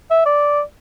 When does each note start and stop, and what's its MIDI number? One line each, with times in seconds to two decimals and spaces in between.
0.10 0.21 76
0.26 0.61 74